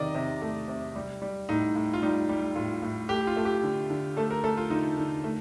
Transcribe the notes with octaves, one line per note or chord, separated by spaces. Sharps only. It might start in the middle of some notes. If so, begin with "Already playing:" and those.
Already playing: C3 D#3 D5 D#5
C3
A3
C3
G3
G3
A2 D#4
A2
F4
G3 D#4
G3
A2 F4
A2
A3 G4
F4
A3
G4
D3
D3
A3 A4
A#4
A3 A4
F4
D3 D#4
D3
A3